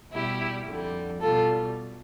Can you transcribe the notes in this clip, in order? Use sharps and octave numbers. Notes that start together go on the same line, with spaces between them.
B2 G3 E4 G4
F2 D3 G3
B2 G3 F4 A4